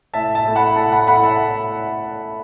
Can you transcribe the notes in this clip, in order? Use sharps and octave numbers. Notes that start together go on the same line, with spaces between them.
A2 E5 A5
E5 A5
A3 E4
F#5 B5
A2 E5 A5
F#5 B5
A3 E4 F#5 B5
E5 A5